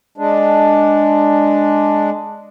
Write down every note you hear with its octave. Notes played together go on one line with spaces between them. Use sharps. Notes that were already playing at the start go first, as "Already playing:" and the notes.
G#3 D4